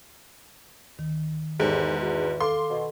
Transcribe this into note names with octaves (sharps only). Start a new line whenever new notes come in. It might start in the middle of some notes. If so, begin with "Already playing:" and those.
D2 D#3
E2 G#2 G4 A4 C5
F#4
A4 F5 C6 D6
B2